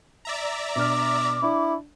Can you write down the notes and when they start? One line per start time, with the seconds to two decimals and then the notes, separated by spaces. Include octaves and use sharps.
0.25 D5 E5 A#5
0.76 B2 D4 D6 F6
1.43 D4 E4